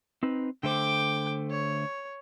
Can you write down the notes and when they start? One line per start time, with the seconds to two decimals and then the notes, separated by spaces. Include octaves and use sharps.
0.23 C4 D#4 B4
0.63 D3 A3 C5 G5 D6
1.50 C#5